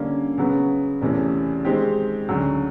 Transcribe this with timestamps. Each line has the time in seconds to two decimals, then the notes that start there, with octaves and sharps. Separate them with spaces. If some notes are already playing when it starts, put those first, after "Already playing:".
Already playing: D3 G3 A#3 C#4
0.38 C#3 F#3 B3
1.01 E2 C3 E3 A3 C#4
1.65 D#3 G#3 C4 D#4 G4
2.29 D2 C#3 F#3